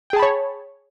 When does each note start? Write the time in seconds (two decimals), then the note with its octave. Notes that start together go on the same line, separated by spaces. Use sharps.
0.10 G5
0.13 G#4
0.16 A5
0.19 B5
0.23 C#5